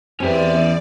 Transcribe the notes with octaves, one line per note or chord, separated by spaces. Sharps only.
E2 C4 C#4 G4 B4 D5 E5